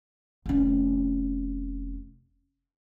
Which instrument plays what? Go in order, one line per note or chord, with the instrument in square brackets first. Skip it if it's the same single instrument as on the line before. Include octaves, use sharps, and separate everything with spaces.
[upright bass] F1 C#4